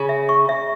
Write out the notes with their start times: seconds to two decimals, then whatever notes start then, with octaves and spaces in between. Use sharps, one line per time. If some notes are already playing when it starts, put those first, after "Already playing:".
Already playing: C#3 B5
0.09 E5
0.29 C#6
0.49 E5